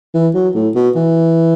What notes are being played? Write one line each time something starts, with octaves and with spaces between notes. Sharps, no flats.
E3
F#3
A2
B2
E3